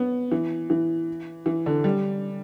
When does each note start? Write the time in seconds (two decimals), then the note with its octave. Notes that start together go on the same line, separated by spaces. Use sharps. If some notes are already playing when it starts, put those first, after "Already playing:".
Already playing: B3
0.32 E3
0.70 E3
1.46 E3
1.66 D3
1.84 G3